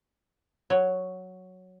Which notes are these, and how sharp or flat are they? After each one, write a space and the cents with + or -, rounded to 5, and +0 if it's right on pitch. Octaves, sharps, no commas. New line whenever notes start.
F#3 +0 C#5 +0